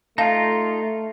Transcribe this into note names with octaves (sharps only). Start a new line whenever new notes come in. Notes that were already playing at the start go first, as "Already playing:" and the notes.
A3 D#4 F4 F5 A5